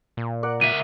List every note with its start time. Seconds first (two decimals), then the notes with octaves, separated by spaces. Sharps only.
0.17 A#2
0.43 A#4 D5 F#5
0.61 C#2 E5 D#7